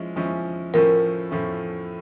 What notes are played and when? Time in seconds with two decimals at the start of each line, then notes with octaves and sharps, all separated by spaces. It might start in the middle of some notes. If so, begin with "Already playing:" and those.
Already playing: F3 G#3 C#4 E4
0.16 F3 G#3 C#4 E4
0.74 A2 F3 A3 C#4 A#4
1.31 A2 F3 A3 C#4